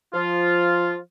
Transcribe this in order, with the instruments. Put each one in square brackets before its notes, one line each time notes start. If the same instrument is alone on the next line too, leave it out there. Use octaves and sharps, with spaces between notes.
[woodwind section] F3 F4